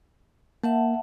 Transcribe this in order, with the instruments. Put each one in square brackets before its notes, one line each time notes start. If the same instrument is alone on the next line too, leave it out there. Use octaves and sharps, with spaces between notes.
[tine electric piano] A#3 [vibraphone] E5 F#5 A5